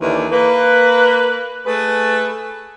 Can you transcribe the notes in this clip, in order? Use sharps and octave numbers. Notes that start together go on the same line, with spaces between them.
D#2 D3 E3
A#3 B4
A3 G#4 B4